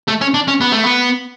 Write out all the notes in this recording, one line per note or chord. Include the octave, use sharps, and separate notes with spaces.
A3
C#4
D4
C#4
B3
A3
B3